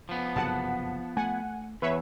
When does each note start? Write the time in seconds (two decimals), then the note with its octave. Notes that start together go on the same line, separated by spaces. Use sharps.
0.09 F3 B3
0.36 F#1 G2 C3 F#5 A5
1.17 A3 F#5 G#5
1.82 E2 B4 C#5 E5